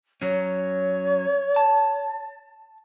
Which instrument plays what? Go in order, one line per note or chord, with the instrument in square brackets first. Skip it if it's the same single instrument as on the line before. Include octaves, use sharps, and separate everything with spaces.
[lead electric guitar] F#3 C#4 [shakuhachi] C#5
[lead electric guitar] A5